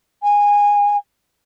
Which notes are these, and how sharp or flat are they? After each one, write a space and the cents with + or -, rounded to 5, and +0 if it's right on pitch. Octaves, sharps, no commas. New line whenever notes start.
G#5 -20